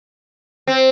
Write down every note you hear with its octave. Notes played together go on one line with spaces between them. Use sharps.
C4